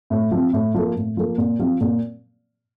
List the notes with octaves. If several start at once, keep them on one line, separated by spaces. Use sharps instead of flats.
A2
F3 C4
A2
F3 A#3
A2
F3 A#3
A#2
F3 C4 F4
A#2